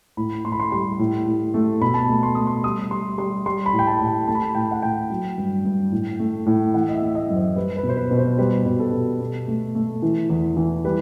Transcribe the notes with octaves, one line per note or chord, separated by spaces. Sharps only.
A2 B5
A2 C6
B5
C6
G3 C6
A2
A2
A3
B2 B5
A5
A3 B5
C6
A3 D#6
C6
G3 D#6
G3 C6
G3 C6
G3 C6
B5
A2
G5
A5
A2
G5
A3 A5
B5
A5
A2 G5
F#5
A2 G5
F#3
G2
G2
A2
A3
A2
E3 F#5
D#5
E5
A3
D#5
F#2
C5
G3 B4
B4
B2
C5
B4
B2
C5
G3 B4
B2
A4
B2
B2
A3
A3
E3
E2
E3
G3 B4